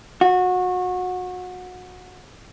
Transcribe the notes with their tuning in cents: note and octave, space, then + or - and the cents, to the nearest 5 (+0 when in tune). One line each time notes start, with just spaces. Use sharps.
F#4 -25